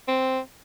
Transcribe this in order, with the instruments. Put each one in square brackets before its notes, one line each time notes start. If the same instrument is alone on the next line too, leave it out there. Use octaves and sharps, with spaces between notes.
[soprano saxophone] C4